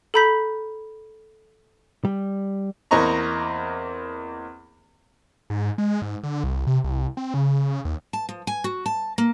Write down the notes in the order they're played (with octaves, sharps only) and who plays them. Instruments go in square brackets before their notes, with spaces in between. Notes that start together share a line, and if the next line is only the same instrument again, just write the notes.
[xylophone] A4 A#5 B5 G6 B6
[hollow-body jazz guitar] G3
[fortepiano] E2 A#3 C4 D#5 A#5 C#6
[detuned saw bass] G#2
G#3
G#2
D3
C2
C3
C2
C4
C#3
D#2
[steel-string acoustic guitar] A5
F3
G#5
F#4
A5
A#3